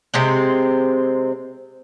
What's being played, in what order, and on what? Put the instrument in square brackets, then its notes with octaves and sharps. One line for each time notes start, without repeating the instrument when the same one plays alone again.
[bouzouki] C3 G#3 C4